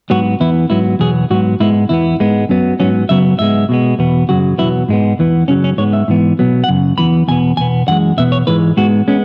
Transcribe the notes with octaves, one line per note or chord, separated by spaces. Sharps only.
G#2 F#3 B3 F#4
E2 E3 B3 E4
G#2 F#3 B3 E4
E2 B2 F#3 B3 G#4
G#2 F#3 B3 F#4
G#2 G#3 B3 E4
E2 E3 B3 E4
G#2 G#3 B3
F#2 F#3 B3
G#2 F#3 B3 C#4
F#2 C#3 F#3 B3 E5
G#2 G#3 B3 E5
B2 G#3 B3
E2 B2 B3
F#2 C#3 F#3 F#4
E2 B2 F#3 B3 E4
G#2 G#3 B3
E2 E3 B3
F#2 C#3 F#3 C#4
C#4
G#2 G#3 B3 C#5
E5
G#2 E3 B3
B2 F#3 B3
F#5
F#2 C#3
E2 E3 B3 B5
E2 B2 B3 G#5
E2 B2 B3 G#5
F#2 E3 G#3 F#5
E2 B2 B3 E5
C#5
G#2 E3 G#3 B4
G#2 G#3 B3 F#4
G#3 B3 C#4